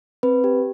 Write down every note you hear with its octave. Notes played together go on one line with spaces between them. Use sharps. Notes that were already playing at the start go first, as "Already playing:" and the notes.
C4 B4
G4